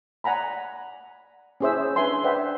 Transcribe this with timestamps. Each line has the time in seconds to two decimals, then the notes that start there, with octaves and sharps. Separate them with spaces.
0.24 D5 F#5 G#5 A#5 B5
1.60 C#4 E4 G#4 C5 E5 E6
1.96 D4 G#4 B4 E5 G#5 C6
2.24 B4 C5 D5 E5 F#5 G5